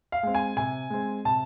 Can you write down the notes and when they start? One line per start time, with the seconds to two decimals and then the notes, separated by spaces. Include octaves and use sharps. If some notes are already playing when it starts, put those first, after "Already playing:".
0.12 F5
0.23 G#3 C4
0.35 G#5
0.56 C3 G#5
0.90 G#3 C4
1.25 C3 A5